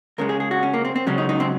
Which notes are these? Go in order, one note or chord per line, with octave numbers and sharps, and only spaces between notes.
C#2 C#3 G#3 A#4
G#4
G#4
F#4
C#4
A#3
C4
C4
C#2 C#3 F#3 C#4
D#4
D#4
C4